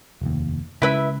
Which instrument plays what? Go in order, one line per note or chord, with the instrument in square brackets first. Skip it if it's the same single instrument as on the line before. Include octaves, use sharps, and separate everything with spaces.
[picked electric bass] F1 D#2
[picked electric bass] C#3 G#3 [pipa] E4 B4 E5